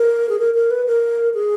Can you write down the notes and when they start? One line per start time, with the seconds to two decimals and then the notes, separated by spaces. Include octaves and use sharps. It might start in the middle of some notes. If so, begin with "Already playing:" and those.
Already playing: A#4
0.29 G#4
0.39 A#4
0.54 A#4
0.71 B4
0.87 A#4
1.34 G#4